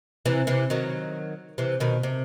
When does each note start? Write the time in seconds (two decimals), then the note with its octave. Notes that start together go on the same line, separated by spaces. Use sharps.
0.26 C3 E3
0.47 C3 E3
0.70 D#3 F#3
1.58 C3 E3
1.80 B2 D#3
2.03 C3